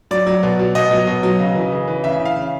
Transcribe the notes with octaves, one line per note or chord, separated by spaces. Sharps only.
F#3 D5
F#3
B2
F#3
B2 D#5
F#3
B2
F#3
C#3
E3
C#3
E3
C#3 E5
C#3
F5
C#3